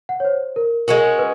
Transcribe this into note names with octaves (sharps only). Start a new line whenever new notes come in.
F#5
C#5
C5
A#4
G#3 C#4 F#4 A#4
B4